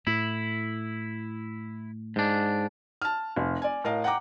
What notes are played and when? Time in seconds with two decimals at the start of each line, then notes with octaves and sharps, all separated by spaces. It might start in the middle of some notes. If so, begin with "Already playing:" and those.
0.07 A2 E4
2.16 G#2 D4
3.02 A5 F6
3.36 F1
3.62 D5 G#5
3.84 A2 A#4 D#5 F5
4.04 F#5 G5 A#5 D6